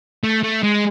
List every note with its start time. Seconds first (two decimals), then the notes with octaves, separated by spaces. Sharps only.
0.24 A3
0.43 A3
0.63 G#3